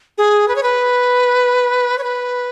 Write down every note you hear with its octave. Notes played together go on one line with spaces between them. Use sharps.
G#4
B4
C#5
B4
C#5
B4